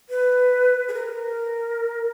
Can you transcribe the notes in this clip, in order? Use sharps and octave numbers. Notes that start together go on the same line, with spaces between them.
B4
G#4
A#4